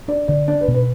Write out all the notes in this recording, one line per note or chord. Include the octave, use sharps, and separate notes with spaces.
D4 D5
D3 D5
D4 D5
B4
B2
B4